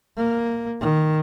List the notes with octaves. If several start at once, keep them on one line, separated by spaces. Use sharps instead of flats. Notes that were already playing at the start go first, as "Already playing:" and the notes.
A#3
D#3